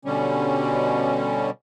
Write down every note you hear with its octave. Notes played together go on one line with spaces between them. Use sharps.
B2 D3 G3 C#4